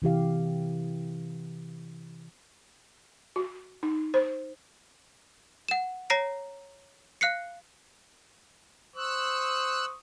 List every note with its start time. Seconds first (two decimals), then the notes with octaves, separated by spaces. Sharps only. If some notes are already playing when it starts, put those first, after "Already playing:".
0.02 C3 E3 G4 F5
3.36 F#4
3.83 D#4
4.14 C5
5.69 F#5 E7
6.10 C#5 A#5 A#6 C7 D7
7.21 F5 F#6 C7 C#7
8.96 C5 C#6 D#6 E6 F#6